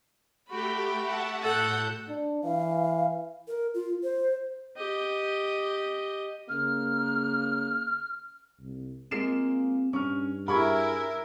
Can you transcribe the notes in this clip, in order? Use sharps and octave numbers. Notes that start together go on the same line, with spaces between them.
A3 F#4 G4 G5 B5
E5 F#5 A5
A2 A4 F#5 G6
D4
E3 F5
A#4
F4
C5
G4 D#5
C#3 A#3 F6
C2
G#3 A#3 C4 F4 C7 E7
G2 C#4 C#6 F6
E4 G4 G#4 A#4 E5 B5 C#6 G#6